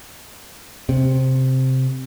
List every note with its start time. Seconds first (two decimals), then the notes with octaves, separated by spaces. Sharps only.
0.89 C3